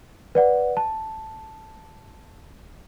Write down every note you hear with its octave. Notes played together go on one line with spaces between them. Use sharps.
B4 D5 F#5
A5